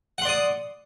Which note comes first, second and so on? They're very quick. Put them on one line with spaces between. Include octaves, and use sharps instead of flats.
F#5 C6 D5 D#6